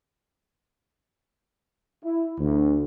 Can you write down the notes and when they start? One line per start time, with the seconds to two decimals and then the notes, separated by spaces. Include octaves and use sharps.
2.04 E4
2.40 D2